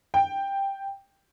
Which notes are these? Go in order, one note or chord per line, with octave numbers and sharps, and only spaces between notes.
G5